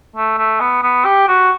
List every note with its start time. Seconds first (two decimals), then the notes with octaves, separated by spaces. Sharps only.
0.16 A3
0.38 A3
0.60 B3
0.83 B3
1.05 G4
1.28 F#4